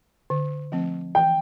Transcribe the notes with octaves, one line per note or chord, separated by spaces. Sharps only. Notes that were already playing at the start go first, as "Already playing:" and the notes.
D3
F3 A3 C4
E3 G5